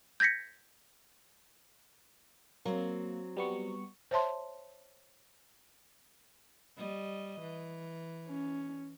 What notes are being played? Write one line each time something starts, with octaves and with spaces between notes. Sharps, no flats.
G6 G#6 A#6 B6 C#7
F#3 A#3 C4
G3 B3 C#6
C5 C#5 E5 A5 C6
G3 D#5
E3
C#4